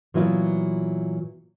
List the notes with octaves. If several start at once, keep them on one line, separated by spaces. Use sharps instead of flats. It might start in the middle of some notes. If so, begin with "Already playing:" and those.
A#2 E3 F#3 B3 E4 F4